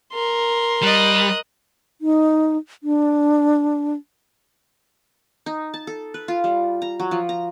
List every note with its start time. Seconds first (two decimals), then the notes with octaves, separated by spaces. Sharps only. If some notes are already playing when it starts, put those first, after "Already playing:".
0.13 A#4 C6
0.82 G3 D#5 F#6
2.01 D#4
2.83 D4
5.46 D#4
5.74 A5
5.87 A4
6.14 B4
6.28 F4
6.44 G3
6.82 A#5
7.00 F#3
7.11 F3
7.29 A#5